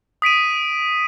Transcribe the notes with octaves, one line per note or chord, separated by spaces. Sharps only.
D#6 B6 D7 D#7